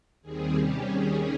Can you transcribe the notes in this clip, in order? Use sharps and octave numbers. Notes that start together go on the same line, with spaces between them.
D#2 D#3 G3 C4 G#4
C3 G3 C#4 G4
D#2 D#3 G3 C#4 G#4